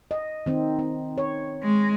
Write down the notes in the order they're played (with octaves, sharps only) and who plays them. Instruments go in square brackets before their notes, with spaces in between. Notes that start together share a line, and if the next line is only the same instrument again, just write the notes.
[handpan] D#5
D#3 C4 D#4
C4
C#5
[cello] G#3